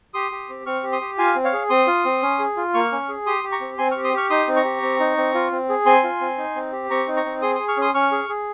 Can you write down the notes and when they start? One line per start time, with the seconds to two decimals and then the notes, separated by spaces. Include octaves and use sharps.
0.14 G4 C6 D#6
0.32 G4
0.49 C4
0.66 C4 C#6 F6
0.83 G4
0.92 C6 D#6
1.01 G4
1.18 F4 F5 G#5
1.35 C4
1.44 C#5 F5
1.53 G#4
1.70 C4 C6 D#6
1.87 F4
2.05 C4
2.22 C#4
2.39 G#4
2.57 F4
2.74 A#3 C#6 F6
2.92 C#4
3.09 G#4
3.26 G4 C6 D#6
3.44 G4
3.52 A#5 C#6
3.61 C4
3.78 C4 G#5 C6
3.91 C#6 F6
3.96 G4
4.04 C6 D#6
4.13 G4 C#6 F6
4.30 D#4 C6 D#6
4.47 C4
4.56 A#5 C#6
4.65 G4
4.82 C4
5.00 D#4
5.17 C4
5.34 F4
5.51 C4
5.69 G#4
5.86 C4 G#5 C6
6.04 F4
6.21 C4
6.38 D#4
6.55 C4
6.72 G4
6.90 C4 A#5 C#6
7.07 D#4
7.16 A#5 C#6
7.25 C4
7.42 G#4 C6 D#6
7.55 G#4 C6 D#6
7.68 C#6 F6
7.77 C#4 C6 D#6
7.94 C#4 C#6 F6
8.12 G#4
8.29 G#4